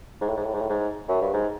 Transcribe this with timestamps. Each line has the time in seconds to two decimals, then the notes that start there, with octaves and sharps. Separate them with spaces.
0.21 G#2
0.29 A2
0.37 G#2
0.45 A2
0.54 G#2
0.61 A2
0.69 G#2
1.09 F#2
1.21 G2
1.33 G#2